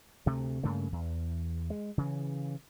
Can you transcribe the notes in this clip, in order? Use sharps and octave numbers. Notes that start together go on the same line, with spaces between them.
D2 C3 A3
G2 C#3 A3 A#3
E2
G#3
C#3 E3